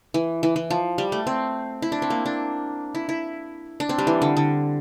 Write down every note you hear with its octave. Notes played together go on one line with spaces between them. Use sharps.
E3
E3
E3
F3
G3
A3
C4
E4
D4
C4
A#3
D4
E4
E4
D4
C4
G3
E3
D3
D3